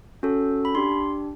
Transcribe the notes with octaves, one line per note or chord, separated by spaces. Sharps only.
C#4 F#4 A4
B5
D4 G4 C6